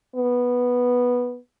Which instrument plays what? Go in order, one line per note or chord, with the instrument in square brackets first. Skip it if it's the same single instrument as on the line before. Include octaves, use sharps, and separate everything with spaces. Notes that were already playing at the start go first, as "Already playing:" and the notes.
[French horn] B3